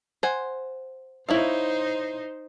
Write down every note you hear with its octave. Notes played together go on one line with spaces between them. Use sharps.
C5 F#5 G#5
D#4 E4 C5 C#5 F5